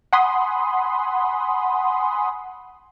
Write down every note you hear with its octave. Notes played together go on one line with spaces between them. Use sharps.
F#5 G#5 B5 C6 D#6